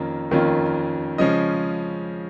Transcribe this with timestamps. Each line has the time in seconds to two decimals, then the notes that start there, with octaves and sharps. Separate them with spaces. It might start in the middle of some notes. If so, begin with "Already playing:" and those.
Already playing: F2 D#3 A#3 C#4 F4
0.31 F2 D#3 A#3 C#4 F4
1.18 C#3 F3 G#3 C#4 D#5